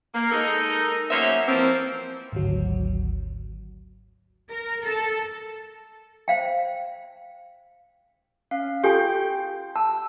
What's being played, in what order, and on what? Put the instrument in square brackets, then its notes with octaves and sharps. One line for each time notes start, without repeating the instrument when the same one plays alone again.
[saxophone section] A#3
G#3 D#4 A4 A#4
F#3 A#3 B3 C#4 C5 E5
E3 F3 A#3 C4
[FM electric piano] G#1 D2 F#3
[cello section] A#4
A4
[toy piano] C5 F5 G5
[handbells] C#4 F5
[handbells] F4 G5 G6 [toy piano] G4 A4 G#5
[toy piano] A5 [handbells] E6